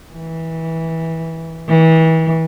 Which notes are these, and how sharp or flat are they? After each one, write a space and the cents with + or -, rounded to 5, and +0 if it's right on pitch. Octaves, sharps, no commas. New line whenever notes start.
E3 -20
E3 -35